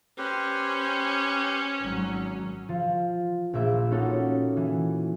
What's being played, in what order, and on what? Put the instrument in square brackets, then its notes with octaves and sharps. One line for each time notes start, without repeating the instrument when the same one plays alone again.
[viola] C#4 [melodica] G4 B4 C5
[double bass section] G#1 F#3
[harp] F3
A#1 A#3 E5
A#3 C#4 D#4 F#4 A4
E3